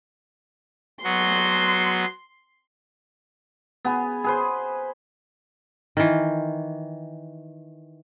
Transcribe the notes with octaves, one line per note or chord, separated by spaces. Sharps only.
F#3 B3 F#4 C6
B3 G#4
G#4 B4 C5
D#3 E3